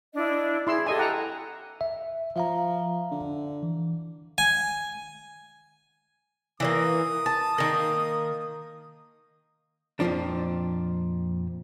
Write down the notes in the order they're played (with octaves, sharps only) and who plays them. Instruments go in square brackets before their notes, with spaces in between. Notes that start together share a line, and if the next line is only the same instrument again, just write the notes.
[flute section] D4 E4 D#5
[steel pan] E4 C6 E6 [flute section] G#4
[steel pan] G4 D#5 G#5 [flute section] A4
[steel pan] F#5 G5 A#5
[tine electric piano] E5
[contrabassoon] F3 [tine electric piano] E5 F5 A#5
[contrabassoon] D3
[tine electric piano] E3
[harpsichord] G#5
[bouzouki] E3 G3 A#3 [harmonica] D#6
[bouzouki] A5
D#3 A#3
[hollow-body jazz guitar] F2 A#2 D3 F3 D4